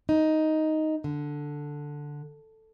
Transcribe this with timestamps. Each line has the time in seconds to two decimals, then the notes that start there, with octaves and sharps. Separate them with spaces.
0.09 D#4
1.04 D3